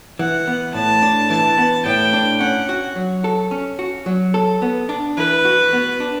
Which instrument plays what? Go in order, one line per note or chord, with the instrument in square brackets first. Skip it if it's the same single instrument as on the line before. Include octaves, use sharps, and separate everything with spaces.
[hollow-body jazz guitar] E3 [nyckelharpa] F#5
[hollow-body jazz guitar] B3
[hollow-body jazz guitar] A2 [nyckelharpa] A5
[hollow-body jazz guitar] D4
[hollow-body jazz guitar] E3 [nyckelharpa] A5
[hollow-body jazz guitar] B3
[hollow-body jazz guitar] A2 [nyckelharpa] G5
[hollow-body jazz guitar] D4
[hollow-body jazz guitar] C#4 [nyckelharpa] F#5
[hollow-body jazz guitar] F#4
F#3
A4
C#4
F#4
F#3
A4
B3
D4
[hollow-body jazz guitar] E3 [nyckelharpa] B4
[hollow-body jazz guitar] F#4
B3
D4